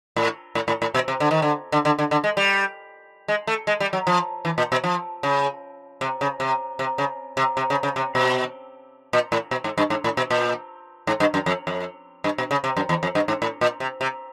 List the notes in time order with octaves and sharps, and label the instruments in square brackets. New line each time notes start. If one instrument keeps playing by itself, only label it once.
[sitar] A2
A2
A2
A2
B2
C3
D3
D#3
D3
D3
D3
D3
D3
G#3
G3
G#3
A3
G#3
G3
F#3
F3
E3
A#2
B2
F3
C#3
C3
C#3
C3
C3
C#3
C3
C3
C#3
C#3
C3
B2
A#2
A2
B2
G#2
G2
G#2
A2
B2
A#2
G#2
G2
F#2
F2
F2
G2
B2
C#3
C3
F#2
E2
F2
G2
G#2
A2
A#2
C3
C3